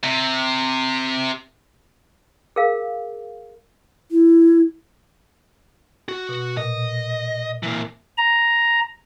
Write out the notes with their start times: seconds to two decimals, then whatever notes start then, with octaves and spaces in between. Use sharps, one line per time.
0.04 C3
2.56 G#4 A#4 F5
4.11 E4
6.09 F#4
6.29 B2
6.57 A#2 D#5
7.63 E3 A#3
8.18 A#5